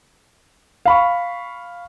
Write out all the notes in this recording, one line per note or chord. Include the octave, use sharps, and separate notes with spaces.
F5 B5 C#6